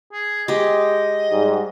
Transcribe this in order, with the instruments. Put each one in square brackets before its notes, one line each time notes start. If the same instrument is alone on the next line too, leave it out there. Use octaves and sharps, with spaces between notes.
[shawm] G#4
[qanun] G#3 G4 [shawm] D#5
[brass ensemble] G#2 G3